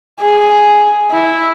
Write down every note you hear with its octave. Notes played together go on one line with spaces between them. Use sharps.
G#4
E4